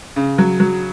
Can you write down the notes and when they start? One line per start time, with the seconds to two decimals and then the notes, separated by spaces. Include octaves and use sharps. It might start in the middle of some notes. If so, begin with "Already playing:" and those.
0.16 C#3
0.38 F#3
0.60 F#3